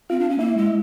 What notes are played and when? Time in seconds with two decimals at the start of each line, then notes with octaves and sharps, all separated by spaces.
0.10 C4 F4
0.20 D4
0.30 C#4
0.39 A#3 E4
0.57 G#3